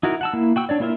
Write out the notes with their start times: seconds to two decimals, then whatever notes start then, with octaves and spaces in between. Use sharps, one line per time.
0.03 D#4 E4 F#4 A#4
0.21 F#5 A5 E6
0.33 A#3 E4
0.56 F#4 G5 E6
0.69 D4 C#5 D5
0.80 A#3 E4 F4 A#4 E5